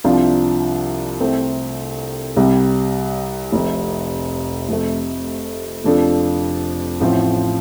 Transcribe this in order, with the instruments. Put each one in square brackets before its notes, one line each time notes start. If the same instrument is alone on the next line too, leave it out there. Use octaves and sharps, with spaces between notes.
[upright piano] C2 C3 F3 D4 F4
C2 C3 A3 C4
C2 C3 G3
F1 F2 C3
F1 F2 C3 A3
F1 F2 F3 D4 A4
A1 A2 F3 C4